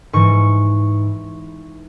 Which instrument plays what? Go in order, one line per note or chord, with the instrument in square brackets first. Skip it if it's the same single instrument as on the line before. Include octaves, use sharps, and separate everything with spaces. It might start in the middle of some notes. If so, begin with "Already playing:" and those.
[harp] G#2 E3 C#6